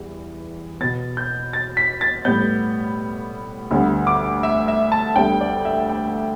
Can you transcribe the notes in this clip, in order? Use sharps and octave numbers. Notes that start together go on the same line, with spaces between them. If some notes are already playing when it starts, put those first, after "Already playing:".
Already playing: E2 E3 G3
B2 B3 A6
G6
A6
B6
A6
A2 G3 B3 G6
D2 D3 G3 B3
D6
E5
E5
A5
D2 D3 G3 B3 G5
D5
E5
G5